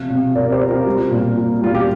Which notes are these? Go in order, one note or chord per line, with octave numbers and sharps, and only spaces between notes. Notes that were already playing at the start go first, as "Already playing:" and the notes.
Already playing: C3 F3 F5
C3
C3 A#4 D5
G4 C5
C3
F4 A#4
G3
A#2
A#2
G3 F4
G4